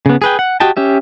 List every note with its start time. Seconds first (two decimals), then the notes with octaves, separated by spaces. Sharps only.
0.06 C#3 B3
0.22 G#4 B4 G5
0.39 F#5
0.60 F#4 G4 D#5 G5 A5
0.77 C#4 G4 E5